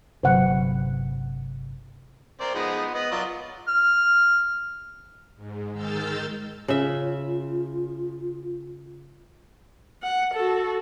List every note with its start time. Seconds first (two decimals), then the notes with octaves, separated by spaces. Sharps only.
0.23 G1 C3 F#3 C5 F#5
2.41 C4 A#4 C5 D5
2.54 F3 G#3 B3 D#4
2.94 B3 D#5
3.12 F#3 F4 D5
3.68 F6
5.36 G#2
5.72 D#3 G#3 E6 F6 G6 A6
6.68 C#3 F4 E5
10.03 F#5
10.34 F#4 A4